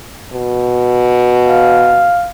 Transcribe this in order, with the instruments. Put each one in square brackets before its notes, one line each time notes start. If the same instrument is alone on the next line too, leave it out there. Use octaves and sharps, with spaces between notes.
[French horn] B2
[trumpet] F5